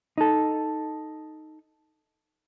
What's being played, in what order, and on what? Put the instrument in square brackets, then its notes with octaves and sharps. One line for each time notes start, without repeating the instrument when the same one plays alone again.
[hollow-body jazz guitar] D#4 A4